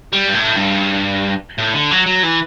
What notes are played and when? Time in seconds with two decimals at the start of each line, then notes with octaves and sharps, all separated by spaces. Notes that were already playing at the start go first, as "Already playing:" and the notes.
0.13 G3
0.28 G2
0.34 A2
0.56 G2
1.58 A2
1.74 D3
1.91 F#3
2.06 F#3
2.23 E3